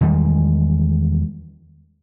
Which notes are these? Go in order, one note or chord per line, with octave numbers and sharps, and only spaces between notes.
E2 D#3 G3 G#3